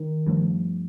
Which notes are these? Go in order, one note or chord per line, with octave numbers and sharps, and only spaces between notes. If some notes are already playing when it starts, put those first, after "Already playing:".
Already playing: D#3
G2 F3 A3